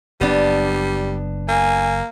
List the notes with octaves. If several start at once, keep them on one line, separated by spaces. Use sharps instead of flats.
F#1 G3 B3 D4
A#3 G#5